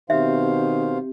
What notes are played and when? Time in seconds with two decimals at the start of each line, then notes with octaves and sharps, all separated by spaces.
0.10 B2 D#3 C4 G4 C5 E5 F5